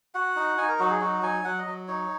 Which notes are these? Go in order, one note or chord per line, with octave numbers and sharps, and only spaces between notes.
F#4 F#5
D#4
D#4 G#5
A#4
F#3 F#4
G#4
D#4 F#4
F#3 G#5
F#3 F#5
D#5
F#3
D#4 C#5